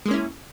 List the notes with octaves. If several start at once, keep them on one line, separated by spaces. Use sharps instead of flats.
G#3 A#3 C#4 E4